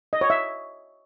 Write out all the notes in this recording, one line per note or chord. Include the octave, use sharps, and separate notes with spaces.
D#5
C#5
E5